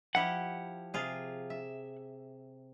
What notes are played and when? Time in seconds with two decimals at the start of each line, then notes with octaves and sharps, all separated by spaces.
0.15 F3 E4 G4 F#5
0.94 C3 F4 G#4
1.50 E5